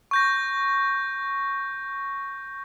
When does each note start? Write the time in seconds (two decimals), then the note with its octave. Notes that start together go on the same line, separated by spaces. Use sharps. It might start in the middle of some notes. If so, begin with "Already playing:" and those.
0.11 C#6 G6 A#6